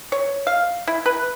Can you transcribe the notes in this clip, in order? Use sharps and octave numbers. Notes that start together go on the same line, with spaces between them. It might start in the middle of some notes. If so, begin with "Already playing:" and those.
C#5
F5
E4
B4